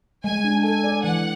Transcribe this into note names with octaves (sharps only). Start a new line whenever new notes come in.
G#3 G#5
D4
A4 G#5
D5
E3 F#5